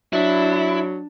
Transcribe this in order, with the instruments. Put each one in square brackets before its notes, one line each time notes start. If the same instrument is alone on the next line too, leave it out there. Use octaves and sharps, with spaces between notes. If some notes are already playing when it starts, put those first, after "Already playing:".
[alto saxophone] F#3 [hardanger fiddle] D4 [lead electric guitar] E4